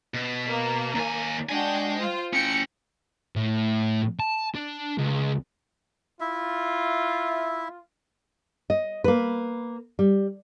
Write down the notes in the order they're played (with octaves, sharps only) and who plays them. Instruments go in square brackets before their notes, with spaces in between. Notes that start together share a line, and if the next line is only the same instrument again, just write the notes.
[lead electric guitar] B2
[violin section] A#3
[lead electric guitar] D#2 G#5
[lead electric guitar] G#3 G#5 [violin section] D4 F#4 G5
[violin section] F4 C5
[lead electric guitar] C#4 G5 [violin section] C#7
[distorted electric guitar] A2
A5
D4
C#2
[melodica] E4 E5 [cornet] F4
[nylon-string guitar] D#5
A#3 B4
G3